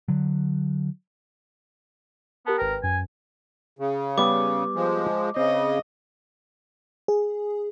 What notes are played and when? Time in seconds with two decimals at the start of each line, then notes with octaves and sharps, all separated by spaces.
0.08 D3 F#3
2.46 B3 G4 A#4 A5
2.58 G#1 A#4 B4 G5
2.83 F#2 G#5
3.79 C#3
4.18 G3 B3 D6
4.75 F3 G#3
5.36 C#3 C4 D#5
7.08 G#4